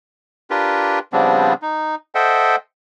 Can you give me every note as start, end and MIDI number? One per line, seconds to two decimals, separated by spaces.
0.50 0.99 62
0.50 0.99 65
0.50 0.99 67
0.50 0.99 70
0.50 0.99 71
1.13 1.54 49
1.13 1.54 53
1.13 1.54 55
1.13 1.54 59
1.13 1.54 60
1.13 1.54 62
1.62 1.95 63
2.15 2.56 69
2.15 2.56 72
2.15 2.56 75
2.15 2.56 76
2.15 2.56 78
2.15 2.56 79